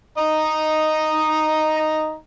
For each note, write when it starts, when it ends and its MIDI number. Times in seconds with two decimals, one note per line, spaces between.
0.18 2.16 63
0.18 2.16 75
0.18 2.16 82